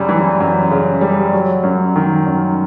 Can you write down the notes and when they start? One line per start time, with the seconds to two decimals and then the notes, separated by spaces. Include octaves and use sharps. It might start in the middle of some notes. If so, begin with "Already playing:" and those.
Already playing: F#2 C#3 G3
0.09 E3
0.40 F#2
0.71 C#3
1.01 G3
1.33 F#3
1.63 F#2
1.96 D#3
2.26 F#2